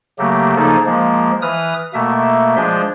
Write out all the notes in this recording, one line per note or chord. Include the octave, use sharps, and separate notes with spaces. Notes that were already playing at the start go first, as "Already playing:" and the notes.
C#3 F#3 A3 A#3 G4
C#3 F3 A#3 D#4 G#4 A4
F3 G#3 A#3
E3 B4 D#6 F6
B2 A3 A#3 E5
F3 G#3 D4 G#4 G6